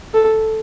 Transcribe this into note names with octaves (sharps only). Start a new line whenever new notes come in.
A4